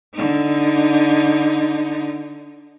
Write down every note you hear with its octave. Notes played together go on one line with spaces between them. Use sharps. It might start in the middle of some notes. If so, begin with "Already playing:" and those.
D3 D#4